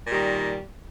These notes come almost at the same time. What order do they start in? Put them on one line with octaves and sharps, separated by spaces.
A#2 G3 D#3